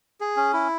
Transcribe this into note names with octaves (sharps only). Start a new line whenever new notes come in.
G#4
C#4
E4